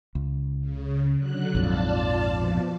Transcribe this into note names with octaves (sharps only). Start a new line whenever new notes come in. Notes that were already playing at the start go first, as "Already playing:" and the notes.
C#2
C#3
D3 F#3 F#6
A#1 F2 G#2 F4 D5 A5
B2 F3